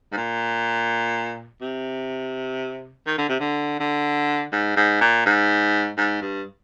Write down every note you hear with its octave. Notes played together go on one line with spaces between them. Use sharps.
G#2
A#2
C3
D#3
D3
C3
D3
D3
G#2
G#2
A#2
G#2
G#2
G2